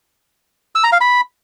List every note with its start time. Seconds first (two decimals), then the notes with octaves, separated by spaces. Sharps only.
0.75 E6
0.84 A#5
0.92 F5
1.01 B5